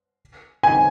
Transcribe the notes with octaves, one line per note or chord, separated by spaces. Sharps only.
G#5